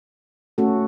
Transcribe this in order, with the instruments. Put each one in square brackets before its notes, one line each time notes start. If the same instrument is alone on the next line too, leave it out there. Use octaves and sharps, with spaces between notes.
[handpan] A3 C#4 F#4 A4